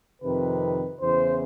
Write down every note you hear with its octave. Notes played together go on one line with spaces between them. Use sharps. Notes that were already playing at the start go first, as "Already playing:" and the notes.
F2 C3 D#3 B4
E2 C#3 E3 C5